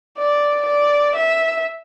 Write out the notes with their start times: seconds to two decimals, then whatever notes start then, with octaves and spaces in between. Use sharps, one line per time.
0.17 D5
0.66 D5
1.15 E5